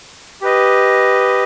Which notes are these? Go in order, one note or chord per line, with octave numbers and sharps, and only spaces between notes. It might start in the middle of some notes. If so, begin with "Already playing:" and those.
G4 B4 D#5